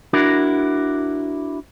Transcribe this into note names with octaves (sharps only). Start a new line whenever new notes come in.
D4 E4 F#4 A#4